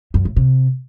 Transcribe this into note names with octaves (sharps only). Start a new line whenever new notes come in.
F#2
A2
C3